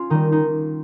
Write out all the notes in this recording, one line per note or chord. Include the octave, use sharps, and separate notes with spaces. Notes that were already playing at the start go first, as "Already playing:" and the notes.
Already playing: C#4 F4
D#3 G3 D#4
D#4